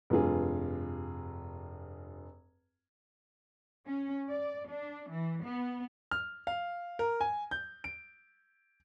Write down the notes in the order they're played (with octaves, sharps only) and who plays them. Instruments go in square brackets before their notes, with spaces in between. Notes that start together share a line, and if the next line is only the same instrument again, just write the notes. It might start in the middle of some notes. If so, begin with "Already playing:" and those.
[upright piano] F1 G2 F4 G#4
[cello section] C#4
D5
D4
E3
B3
[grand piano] F6
F5
A#4
G#5
G6
D7